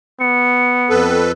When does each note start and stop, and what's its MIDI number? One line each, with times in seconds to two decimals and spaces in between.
0.20 1.21 59
0.20 0.90 97
0.90 1.32 41
0.90 1.32 69
0.90 1.32 71